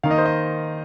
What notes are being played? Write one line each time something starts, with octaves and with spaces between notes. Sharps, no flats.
D#3 A#3 D#4 F5
D#5
C5
D#5